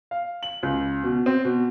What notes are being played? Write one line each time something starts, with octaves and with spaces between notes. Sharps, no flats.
F5
F#7
C#2
B2
C4
B2